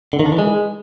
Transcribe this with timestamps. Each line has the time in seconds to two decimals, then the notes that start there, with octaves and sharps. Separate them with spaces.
0.13 D3
0.19 D#3
0.26 D4
0.32 E3
0.38 G#3